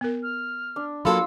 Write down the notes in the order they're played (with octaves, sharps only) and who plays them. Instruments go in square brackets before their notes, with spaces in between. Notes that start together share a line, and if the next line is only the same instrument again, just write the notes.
[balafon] B3 A#4
[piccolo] F6
[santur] D4
[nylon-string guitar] F#3 A#3 A4 [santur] F4 C6 [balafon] B5 [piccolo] E6